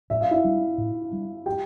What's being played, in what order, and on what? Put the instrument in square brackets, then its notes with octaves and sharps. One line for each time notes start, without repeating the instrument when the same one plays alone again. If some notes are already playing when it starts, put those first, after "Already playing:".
[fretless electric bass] A2 [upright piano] E5
[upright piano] F5
E4 E5
[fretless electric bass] G3 D4
A2
G3 D4
[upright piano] G4 G5